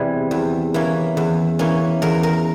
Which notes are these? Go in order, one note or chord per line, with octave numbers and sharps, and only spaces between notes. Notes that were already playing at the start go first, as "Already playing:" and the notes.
Already playing: E2 C3 E3 G3 G#4
E2
E3 A#3 C#4
E2
E3 A#3 C#4
E2 A#4
A#4